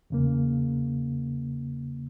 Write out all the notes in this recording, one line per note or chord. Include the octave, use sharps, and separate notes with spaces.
E2 C#3 A#3